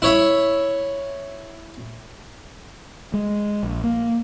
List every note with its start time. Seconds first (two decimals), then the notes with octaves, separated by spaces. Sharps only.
0.02 E4 C#5 E5
3.14 G#3
3.63 A#1
3.84 A#3